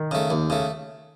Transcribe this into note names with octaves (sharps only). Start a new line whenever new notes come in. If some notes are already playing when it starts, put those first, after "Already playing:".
Already playing: D#3
C#3 A3
D#2
C#3 A3